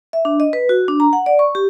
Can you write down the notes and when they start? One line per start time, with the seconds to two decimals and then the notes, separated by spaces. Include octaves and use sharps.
0.13 E5
0.25 D4
0.40 D#5
0.53 B4
0.69 F#4
0.88 D4
1.00 A#5
1.13 F#5
1.26 D5
1.39 C#6
1.55 G4